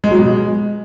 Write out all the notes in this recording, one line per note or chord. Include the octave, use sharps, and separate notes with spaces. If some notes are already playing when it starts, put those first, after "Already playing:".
G#3
F#3
B2
G#3